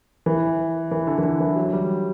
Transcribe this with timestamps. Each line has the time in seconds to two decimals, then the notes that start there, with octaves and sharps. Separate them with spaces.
0.26 E3
0.91 E3
1.07 D3
1.18 E3
1.23 D3
1.40 E3
1.56 F#3
1.73 G3